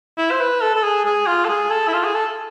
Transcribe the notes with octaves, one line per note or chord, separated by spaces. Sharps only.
E4
C5
B4
A4
A4
G#4
G#4
F4
A4
G#4
A4
E4
F4
G#4
A4